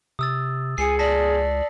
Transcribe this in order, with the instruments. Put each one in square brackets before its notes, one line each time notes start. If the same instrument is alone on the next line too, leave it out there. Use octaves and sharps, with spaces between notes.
[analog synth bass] C3 [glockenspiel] D#6 E6 A6
[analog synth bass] C#2 [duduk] G#4 [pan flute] G#5 [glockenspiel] C7 C#7
[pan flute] D5 [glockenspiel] A5 A#6 B6